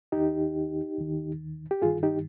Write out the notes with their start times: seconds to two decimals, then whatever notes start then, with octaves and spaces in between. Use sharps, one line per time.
0.12 D#2 D#3 D#4 G4
0.97 D#2 D#3
1.71 G4
1.82 G2 D#3 F4 G#4
2.03 D#4 G4